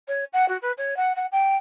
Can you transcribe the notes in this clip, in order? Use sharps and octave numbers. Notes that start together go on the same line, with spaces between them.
C#5
F#5
F#4
B4
C#5
F#5
F#5
G5